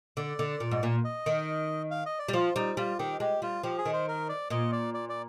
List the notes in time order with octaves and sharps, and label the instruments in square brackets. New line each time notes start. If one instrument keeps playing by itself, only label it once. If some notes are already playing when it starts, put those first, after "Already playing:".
[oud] D3 [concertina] D5
[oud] D3
A#2
G#2
A#2
[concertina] D#5
[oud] D#3
[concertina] F5
D#5
D5
[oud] G3
[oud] F3 [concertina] F4
[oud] G3 [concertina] D#4
[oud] G3 [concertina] F4
[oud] D#3 [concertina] G4
[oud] G#3 [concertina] G4
[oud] G3 [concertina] F4
[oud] F3 [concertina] G4
[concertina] G#4
[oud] D#3
[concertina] C5
A#4
D5
[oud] A#2 [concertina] D#5
[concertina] D5
D5
D5